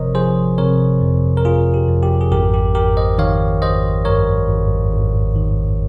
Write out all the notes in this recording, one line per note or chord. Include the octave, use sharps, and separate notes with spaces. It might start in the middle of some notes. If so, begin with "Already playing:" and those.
Already playing: G1 C3 F3 A#4 C5 C#5 D#5
F3 G#4 C5
C3 A#4 C#5
F2
A#4
F2 F4 G#4
G4
F2
G4
G#4
G#1 G4 A#4
G4
G#1 G4 A#4
C5 D#5
D#3 C#5 F5
G#1 C5 D#5
G2 A#4 C#5
G#1
G#1
D#3